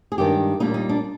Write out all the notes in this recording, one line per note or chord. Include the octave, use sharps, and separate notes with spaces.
G#4
G2 D#3 G#3 D4 G4
A#2 G3 A#3 D4 D#4
D#4
D4